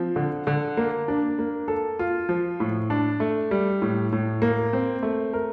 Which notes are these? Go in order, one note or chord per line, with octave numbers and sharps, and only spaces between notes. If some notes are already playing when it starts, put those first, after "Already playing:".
Already playing: F3 C4
D3
D3
A#3
D4
A#3
A4
F4
F3
A2
D4
A3
G3
A2
A2
A#3
C4
A3
A#4